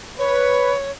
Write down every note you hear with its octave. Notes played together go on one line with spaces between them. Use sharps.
B4 C#5